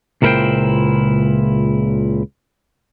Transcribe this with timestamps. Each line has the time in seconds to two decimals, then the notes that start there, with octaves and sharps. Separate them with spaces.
0.22 C#2 A#2 E4 A#4 C5 G5